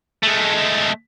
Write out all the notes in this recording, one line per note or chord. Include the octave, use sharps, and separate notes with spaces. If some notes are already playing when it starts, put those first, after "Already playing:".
G#3 A3